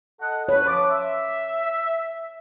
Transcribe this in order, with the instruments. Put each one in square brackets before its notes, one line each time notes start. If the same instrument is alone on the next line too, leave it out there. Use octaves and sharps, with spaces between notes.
[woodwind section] A4 D#5 F#5
[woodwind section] B4 [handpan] C#5
[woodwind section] F3 D6
E5